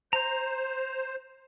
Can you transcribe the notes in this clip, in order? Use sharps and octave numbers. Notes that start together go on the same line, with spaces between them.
C5 A#5